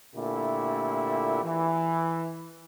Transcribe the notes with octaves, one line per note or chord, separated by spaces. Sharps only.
A#2 D3 A3 E4 G4
E3